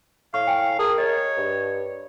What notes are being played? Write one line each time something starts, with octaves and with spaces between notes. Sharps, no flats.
A2 F5 C#6
G5 G#5
G#4 A#4 A5
C#5 D#5
G2